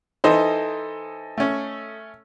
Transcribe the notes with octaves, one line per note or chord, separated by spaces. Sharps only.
E3 D#4 A4 C5 D#5
A3 C#4